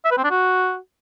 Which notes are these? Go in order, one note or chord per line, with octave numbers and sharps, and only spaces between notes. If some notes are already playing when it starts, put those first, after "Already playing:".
E5
B4
C4
D4
F#4